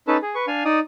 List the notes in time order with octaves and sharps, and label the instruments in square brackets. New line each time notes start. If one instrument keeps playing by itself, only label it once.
[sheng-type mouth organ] C#4 D#4 A4 B4 A5
G#4
B4 C#6
D4 F5 G#5
D#4 D5 D#6